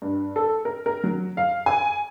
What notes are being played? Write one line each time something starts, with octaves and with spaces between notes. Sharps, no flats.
G2
A4
A#4
A#4
F#3
F5
G#5